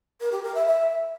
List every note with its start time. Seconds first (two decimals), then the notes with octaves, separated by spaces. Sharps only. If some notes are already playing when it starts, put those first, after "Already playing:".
0.21 A#4
0.32 G4
0.43 A#4
0.55 E5
0.66 E5